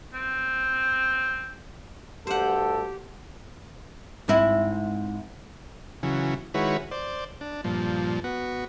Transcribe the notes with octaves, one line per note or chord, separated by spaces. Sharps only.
C4
D2 G2 G4 A4 C5 F#5
G#2 C4 E4
C#3 E3 F#3
D#3 G#3 E4 F#4 B4 C#5
C5 D5
D4
G2 A#2 F3
B3 F#4